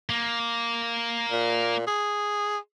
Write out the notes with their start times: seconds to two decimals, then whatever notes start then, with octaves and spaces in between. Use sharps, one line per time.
0.09 A#3
1.32 A#2
1.87 G#4